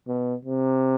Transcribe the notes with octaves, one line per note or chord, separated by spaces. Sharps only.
B2
C3